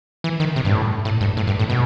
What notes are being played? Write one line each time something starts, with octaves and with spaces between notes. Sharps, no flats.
E3
D#3
C3
G2
A2
A2
G2
A2
G2
A2
B2